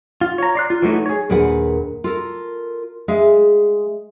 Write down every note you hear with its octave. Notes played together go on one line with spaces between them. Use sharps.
F4
C#5 A#5
D5 C6 F#6
F4
E3 F#3 A3 D#4
G#4 C#5
D#2 A#2 D4 G#4 B4 F#5
F4 A4 A#4
G#3 G#4 E5 F5